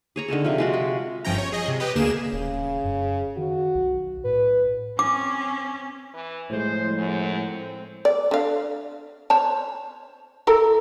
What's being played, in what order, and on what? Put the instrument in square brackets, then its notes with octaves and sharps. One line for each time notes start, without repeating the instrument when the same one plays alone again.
[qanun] G#4 C#5 A#5
D3 D#3 G#4 A4
C3 F3
G#3 F4 F#4
G#3
[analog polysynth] G1 F3 C#4 G5 A#5
C#5
G#4 D#5
C3
G4 B4 D#5
D2 A#3 G#4 E7
[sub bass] D#1 [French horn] C#3
[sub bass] F#2
[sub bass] D#3 [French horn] F#4
[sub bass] B1
[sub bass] A2 [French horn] B4
[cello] C4 C#4 [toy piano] D6
[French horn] E3
[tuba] A2 [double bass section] F3 G#3 [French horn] C5
[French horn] F#2
C4
[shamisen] D5
D3 F5
C5 C#5 A5
E4 A4 A#4